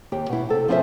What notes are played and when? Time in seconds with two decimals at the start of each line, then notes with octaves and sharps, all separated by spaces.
0.12 D#2 G4 G5
0.29 B2 E4
0.49 C3 A4
0.68 F3 C#4 E4 F4 C5 E5